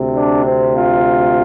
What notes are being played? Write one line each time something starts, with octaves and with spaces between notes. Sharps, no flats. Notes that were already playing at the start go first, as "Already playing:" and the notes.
Already playing: D2 C3
D4
C4
F4